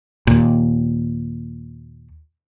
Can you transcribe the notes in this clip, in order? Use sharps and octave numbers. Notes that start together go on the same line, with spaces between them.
D#2 A#2